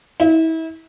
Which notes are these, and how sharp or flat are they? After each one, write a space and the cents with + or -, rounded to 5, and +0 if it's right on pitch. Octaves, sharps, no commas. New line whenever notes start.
E4 -35